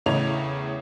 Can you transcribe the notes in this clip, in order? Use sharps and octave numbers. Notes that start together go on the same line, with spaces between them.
E2 A2 C#3 C#5 F7